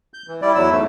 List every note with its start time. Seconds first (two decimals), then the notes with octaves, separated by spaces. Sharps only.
0.14 G6
0.28 E3
0.42 G3 E4 D5
0.55 E2 F#3 E4 E6
0.71 E2 G#2 A3